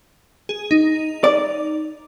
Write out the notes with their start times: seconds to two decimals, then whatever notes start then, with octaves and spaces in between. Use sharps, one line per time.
0.49 G#4
0.71 D#4
1.24 D5